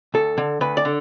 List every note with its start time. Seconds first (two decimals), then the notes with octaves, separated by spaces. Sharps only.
0.14 D2 A4
0.38 D3
0.61 D2 B4
0.77 D5
0.85 D3